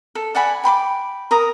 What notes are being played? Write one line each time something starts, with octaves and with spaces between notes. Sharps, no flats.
A4
D5 F#5 G#5 B5
G5 B5 C6 D6
A#4 A#5 D#6